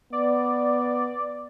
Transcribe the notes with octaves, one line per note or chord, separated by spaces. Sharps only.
B3 D5